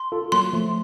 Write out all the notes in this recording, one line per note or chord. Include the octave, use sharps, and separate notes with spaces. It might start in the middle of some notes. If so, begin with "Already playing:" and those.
Already playing: C6
F4 A4
F#3 A#3 C6
F3 A3